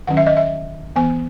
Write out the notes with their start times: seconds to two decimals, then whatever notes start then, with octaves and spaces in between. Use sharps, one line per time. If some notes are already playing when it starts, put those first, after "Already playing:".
0.07 D#3 F#3 C#4 F#5
0.17 E5
0.27 D#5
0.37 E5
0.96 E3 B3 G#5